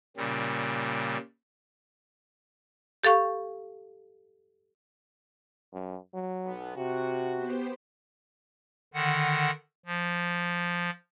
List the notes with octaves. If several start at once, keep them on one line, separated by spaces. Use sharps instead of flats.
A#2 C#3 G3
G4 A4 F5 C#6
F#2
F#3
B1 B3
C3 F#4
B3 G4 C5
D3 D#3 F#5
F3